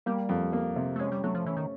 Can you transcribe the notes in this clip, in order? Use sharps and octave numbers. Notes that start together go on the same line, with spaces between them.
G3 A#3
F2
A#3
C3
A3
G#3 C#4
G3
F#3 A3
F3
E3 C#4
D#3